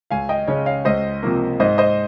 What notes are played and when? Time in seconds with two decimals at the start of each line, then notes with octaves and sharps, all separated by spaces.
0.11 C#2 F5 G#5
0.29 D#5 G5
0.47 C#3 G#3 C#4 C#5
0.66 C#5 F5
0.85 C#2 C5 D#5
1.23 C3 F3 A#3
1.60 G#2 C5 D#5
1.78 C5 D#5